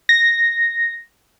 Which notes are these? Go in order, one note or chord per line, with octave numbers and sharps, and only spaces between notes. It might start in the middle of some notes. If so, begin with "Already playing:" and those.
A#6